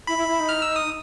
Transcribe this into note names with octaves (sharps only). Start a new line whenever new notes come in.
E4 B5
E4
E4
D#4
F6
E6
D#6